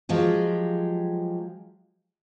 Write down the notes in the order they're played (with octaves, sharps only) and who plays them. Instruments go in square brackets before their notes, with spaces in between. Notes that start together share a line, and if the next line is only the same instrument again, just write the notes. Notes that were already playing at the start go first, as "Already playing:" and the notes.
[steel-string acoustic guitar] F3 F#3 G#3 G4